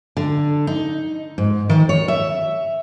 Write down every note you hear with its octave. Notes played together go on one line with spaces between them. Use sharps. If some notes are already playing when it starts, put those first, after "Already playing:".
D3
D#4
G#2
D#3
C#5
E5